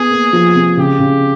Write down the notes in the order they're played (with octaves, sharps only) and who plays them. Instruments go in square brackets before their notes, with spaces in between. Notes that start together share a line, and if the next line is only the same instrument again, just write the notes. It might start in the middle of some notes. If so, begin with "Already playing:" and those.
Already playing: [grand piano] B3 [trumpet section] G#4
[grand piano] A#3
F3
C3
[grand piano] C#3 [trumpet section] G4
[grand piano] C#3